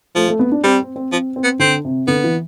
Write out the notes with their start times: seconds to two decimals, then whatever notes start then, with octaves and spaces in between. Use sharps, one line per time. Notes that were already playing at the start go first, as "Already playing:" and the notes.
0.15 F3 A3
0.28 A3
0.39 B3
0.52 D4
0.64 G3 C4
0.80 C4
0.96 C4
1.12 F3 C4
1.36 C4
1.44 B3
1.59 D3 C4
1.85 C3
2.07 D3 B3
2.24 E3